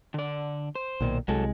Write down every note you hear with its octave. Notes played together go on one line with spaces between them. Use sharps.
D3 D5
C5
B1 A#2 D#3
C2 F#3 G#3 A4